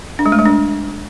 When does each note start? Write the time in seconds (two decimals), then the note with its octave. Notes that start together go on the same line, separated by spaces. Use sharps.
0.19 D4
0.26 G#3
0.32 A3
0.39 G#3
0.45 D4